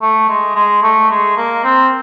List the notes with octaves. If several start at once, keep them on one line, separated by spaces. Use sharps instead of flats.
A3
G#3
G#3
A3
G#3
A#3
C4